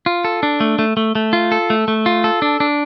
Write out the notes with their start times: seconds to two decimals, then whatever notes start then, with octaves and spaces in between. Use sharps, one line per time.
0.06 F4
0.25 A4
0.43 D4
0.60 A3
0.79 A3
0.97 A3
1.15 A3
1.33 F4
1.52 A4
1.70 A3
1.88 A3
2.06 F4
2.24 A4
2.42 D4
2.60 D4